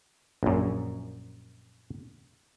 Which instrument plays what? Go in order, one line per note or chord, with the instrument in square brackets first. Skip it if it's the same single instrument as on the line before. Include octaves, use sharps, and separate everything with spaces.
[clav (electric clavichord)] A#1 F#2